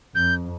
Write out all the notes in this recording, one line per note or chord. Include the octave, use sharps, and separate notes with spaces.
F2 G6